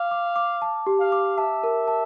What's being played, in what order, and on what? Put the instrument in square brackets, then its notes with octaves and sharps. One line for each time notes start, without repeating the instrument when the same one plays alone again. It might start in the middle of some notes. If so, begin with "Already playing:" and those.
Already playing: [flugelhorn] F5 [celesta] D6
[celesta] D6
D6
A5
G4
[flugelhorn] F5
[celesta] D6
[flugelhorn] E5 [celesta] A5
[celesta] A#4
A5